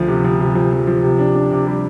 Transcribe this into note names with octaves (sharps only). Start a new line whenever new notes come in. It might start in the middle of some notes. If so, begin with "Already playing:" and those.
Already playing: D2 F3
C3
F3
C3
F3
F3
F3
C3
D4
D4
C3
G3